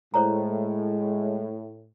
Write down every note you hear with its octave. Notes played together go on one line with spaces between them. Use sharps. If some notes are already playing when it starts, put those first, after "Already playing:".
A2 G#3 C5 C#5 A#5